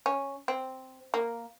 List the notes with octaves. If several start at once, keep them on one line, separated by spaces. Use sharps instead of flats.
C#4
C4
A#3